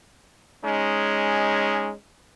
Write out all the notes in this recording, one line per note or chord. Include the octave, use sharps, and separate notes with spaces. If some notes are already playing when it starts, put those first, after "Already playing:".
G#3 C#4 D#4